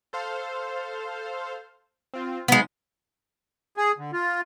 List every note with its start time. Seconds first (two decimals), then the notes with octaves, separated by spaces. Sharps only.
0.13 A4 C5 F5
2.14 C4 F4
2.48 C3 F#3 G#3 B3 D#4
3.77 G#4
3.98 D3
4.13 F4